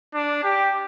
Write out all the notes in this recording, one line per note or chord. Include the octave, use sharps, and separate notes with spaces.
D4
G4